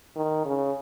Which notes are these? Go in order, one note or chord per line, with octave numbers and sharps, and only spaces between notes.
D#3
C#3